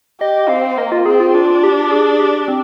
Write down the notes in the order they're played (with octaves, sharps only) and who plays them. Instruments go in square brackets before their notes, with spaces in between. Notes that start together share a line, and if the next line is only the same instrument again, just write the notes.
[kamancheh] G4 [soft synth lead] D#5
[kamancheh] C4 [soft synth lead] F5
[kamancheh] A#3 [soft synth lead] D#5
[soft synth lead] F4
[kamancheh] C4 [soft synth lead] G#4
[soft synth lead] F4
[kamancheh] D4 [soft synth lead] F4
[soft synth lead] G4
G#4
G4
C4